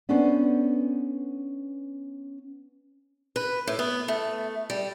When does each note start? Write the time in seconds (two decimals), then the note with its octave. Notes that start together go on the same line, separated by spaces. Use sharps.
0.09 B3 C#4 D4 A4 B4 C5
3.36 B4
3.67 A2
3.79 B3
4.08 A3
4.70 G3